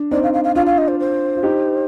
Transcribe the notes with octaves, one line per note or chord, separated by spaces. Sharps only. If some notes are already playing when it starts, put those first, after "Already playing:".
Already playing: D4
C4 D#4 D5
F5
F5
F5
D4 F4 F5
F5
D#5
C5
C5
F4
D#4 G4